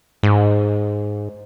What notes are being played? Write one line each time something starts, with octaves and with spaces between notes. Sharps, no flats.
G#2